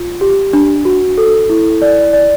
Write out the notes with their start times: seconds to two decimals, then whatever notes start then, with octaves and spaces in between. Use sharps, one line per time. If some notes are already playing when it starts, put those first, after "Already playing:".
Already playing: F4
0.21 G4
0.53 D4
0.85 F#4
1.18 A4
1.50 E4
1.82 D5
2.13 D5